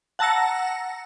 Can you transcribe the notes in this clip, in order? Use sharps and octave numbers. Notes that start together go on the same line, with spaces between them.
F#5 A5 A#5 E6 A#6 C#7